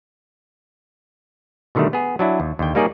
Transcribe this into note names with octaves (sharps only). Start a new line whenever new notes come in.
B2 D3 D#3 G3 A3
B3 G#4
F#3 D4 E4
D#2
D#2 D3 G5
G3 A#3 D#4 G#4 C#5 D5